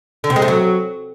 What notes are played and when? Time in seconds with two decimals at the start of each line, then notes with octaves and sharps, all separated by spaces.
0.24 D3
0.30 C3
0.36 G#3
0.42 A3
0.48 F#3